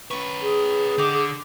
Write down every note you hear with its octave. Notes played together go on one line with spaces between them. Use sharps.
C#4 B4 C#6
G#4
D3 G4 D#5 D6